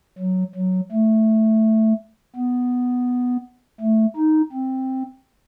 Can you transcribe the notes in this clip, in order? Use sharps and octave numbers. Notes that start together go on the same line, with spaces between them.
F#3
F#3
A3
B3
A3
D#4
C4